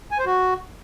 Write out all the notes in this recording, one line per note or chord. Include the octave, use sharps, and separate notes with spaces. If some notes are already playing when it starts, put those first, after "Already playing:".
G#5
C5
F#4